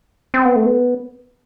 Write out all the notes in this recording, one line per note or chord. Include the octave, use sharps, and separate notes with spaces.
C4
B3
A3
B3